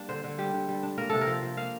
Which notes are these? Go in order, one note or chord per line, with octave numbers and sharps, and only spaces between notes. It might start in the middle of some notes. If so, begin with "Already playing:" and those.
Already playing: G3 A#3 D4
D3 C5
D3
G3 G4
D3
G3
D4
A#3 A#4
C3 A4
A#4
F3
F3
A#3 F5